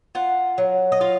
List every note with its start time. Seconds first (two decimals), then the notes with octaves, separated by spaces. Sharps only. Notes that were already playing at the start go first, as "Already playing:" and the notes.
0.15 F4 F#5
0.58 F#3
0.92 D#5
1.01 F4 F5